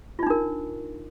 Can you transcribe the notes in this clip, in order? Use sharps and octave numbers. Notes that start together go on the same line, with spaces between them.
D4 D#4 F4 A#4